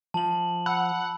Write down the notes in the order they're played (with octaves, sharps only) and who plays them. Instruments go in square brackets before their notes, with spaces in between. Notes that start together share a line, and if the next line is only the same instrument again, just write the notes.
[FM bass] F3 [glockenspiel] A5 F#7
[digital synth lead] F#5 [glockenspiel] B5 E6